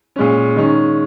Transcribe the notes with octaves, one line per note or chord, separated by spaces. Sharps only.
A#2 G#3 C#4
D#3 G#3 C#4